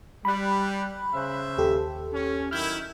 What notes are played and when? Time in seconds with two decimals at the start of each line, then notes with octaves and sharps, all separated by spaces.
0.25 G3 B5 F#6
1.14 C#3 C5 E5
1.58 D#2 G4 A4
2.13 C#4
2.51 F#2 D#3 E4 F6 G6 G#6